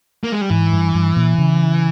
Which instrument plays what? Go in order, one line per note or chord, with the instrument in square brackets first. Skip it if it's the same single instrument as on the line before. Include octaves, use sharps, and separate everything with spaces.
[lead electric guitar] A#3
G#3
G3
[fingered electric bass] G#2 [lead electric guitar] E3
[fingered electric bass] G2
G2
A#2
C#3